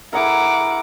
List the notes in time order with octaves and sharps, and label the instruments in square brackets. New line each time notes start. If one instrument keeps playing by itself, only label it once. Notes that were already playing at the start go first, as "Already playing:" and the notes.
[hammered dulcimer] E4 G#4 A#4 [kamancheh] F#5 D6